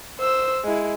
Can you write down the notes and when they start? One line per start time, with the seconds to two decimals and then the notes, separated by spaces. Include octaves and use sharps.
0.19 C5 E6
0.65 G#3 E4